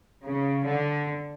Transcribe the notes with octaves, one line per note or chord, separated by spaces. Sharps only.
C#3
D3